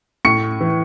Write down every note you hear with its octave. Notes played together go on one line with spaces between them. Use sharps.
A2 C#6 C#7
E3